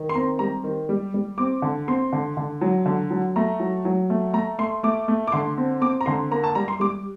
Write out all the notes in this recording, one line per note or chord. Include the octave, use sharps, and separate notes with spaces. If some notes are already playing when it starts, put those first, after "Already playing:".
Already playing: D#3
C6
C4 A#5
G3 A#5
D#3
G3
G3
C4 D6
D3
C4 C6
D3
D3
F#3
D3
F#3
A3 A#5
F#3
F#3
A3
A3 A#5
A3 C6
A3 D6
A3
D6
D3 C6
C4
C4 D6
A#5
D3 C6
A#3 A#5
A5
G3 A#5
C6
G3 D6